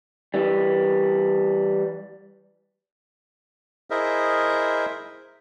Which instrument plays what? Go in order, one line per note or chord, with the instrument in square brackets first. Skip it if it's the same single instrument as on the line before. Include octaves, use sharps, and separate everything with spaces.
[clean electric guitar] E3 G3
[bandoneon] E4 G#4 A#4 C5 D#5 E5